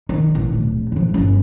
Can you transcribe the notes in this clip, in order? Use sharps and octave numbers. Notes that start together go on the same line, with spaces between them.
D#3
A1
D1 A#1
D#1 F3
G1 C#4